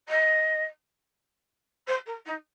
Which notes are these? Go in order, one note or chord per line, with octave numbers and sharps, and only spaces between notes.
D#5
C5
A#4
D#4